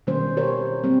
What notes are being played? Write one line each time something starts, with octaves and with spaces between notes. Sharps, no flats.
B2 D#3 G3 A#3 C#4 C5
G4 A#4 C5 C#5
G3 A#3 C4